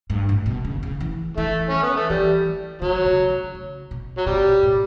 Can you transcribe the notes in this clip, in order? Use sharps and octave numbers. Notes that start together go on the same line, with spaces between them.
G2
A2
B2
C#3
C#3
E3
E3 A3
E3 C#4
B3
A3
E3 G3
E3
D3 F#3
C#3
D3
C#3
B2
F#3
B2 G3
A2